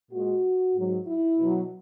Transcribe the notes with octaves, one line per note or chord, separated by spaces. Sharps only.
A#2 G#3 F#4
G#2 F#3
E4
B2 F#3